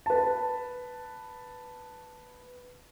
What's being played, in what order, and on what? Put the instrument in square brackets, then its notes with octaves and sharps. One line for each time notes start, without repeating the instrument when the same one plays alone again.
[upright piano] B4 A5